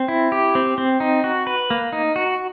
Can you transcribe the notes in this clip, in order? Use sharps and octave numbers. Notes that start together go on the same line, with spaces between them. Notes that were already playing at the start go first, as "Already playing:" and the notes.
Already playing: C4
E4
G4
C4
C4
D#4
F#4
B4
A#3
D#4
F#4